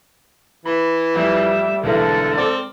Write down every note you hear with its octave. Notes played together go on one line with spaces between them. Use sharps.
E3 B5
F2 G3 E5
B1 E2 D3 G#3 A4 A#4 E5
C4 D5